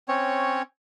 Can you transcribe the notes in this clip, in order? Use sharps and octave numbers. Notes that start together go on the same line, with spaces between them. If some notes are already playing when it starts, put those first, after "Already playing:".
C4 C#4 C#5